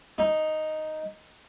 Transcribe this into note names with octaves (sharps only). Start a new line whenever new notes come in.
D#4